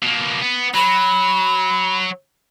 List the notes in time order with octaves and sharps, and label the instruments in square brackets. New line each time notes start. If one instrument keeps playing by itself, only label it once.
[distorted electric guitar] B2 A#3
B3
[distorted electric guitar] F#3 [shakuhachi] B5